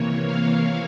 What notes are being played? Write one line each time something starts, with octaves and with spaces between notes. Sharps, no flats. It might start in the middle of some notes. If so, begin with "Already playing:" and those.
Already playing: C3 E3 A#3 C#5
F5